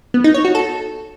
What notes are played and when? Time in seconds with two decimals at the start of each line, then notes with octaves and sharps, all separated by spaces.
0.14 B3
0.24 D#4
0.34 C#5
0.45 F#4
0.55 A4